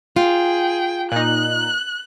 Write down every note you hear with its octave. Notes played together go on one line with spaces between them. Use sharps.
F4 G#4 G5
A#2 D#4 F#6